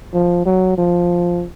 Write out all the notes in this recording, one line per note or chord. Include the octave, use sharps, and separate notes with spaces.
F3
F#3
F3